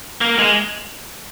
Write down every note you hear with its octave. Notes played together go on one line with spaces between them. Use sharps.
A#3
G#3